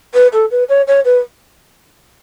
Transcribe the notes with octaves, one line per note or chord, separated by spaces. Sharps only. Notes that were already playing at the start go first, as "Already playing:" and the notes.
B4
A4
B4
C#5
C#5
B4